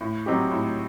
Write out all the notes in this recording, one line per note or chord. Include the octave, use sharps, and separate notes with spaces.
A2
F#3 C4 D#4 G4
A2